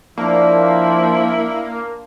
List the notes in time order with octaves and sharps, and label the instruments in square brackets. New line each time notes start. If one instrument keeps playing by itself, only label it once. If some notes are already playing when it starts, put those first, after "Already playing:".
[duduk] F3 [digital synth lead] A#3 [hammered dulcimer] D4 F4 [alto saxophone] E4